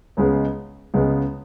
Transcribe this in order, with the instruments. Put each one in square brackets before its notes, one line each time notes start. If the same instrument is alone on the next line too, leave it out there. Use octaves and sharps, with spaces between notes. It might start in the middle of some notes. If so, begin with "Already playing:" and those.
[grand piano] C#2 C#3 G#3 B3
C#2 C#3 G#3 B3